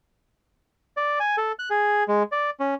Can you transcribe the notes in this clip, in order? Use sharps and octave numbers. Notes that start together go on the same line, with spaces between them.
D5
G#5
A4
F#6
G#4
G#3
D5
C#4